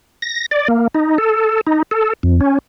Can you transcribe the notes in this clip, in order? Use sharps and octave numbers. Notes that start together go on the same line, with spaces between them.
A#6
D5
A#3
D#4
A4
D#4
A4
F2
C#4